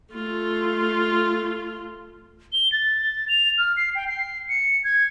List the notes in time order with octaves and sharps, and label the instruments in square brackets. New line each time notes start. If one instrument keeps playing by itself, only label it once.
[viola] A3 F4
[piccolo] G7
A6
F7
F6
C7
G5
C7
C#7
G#6